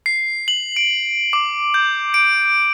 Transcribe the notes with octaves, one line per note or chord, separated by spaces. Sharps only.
C7
F#7
D7
D6
G6
D7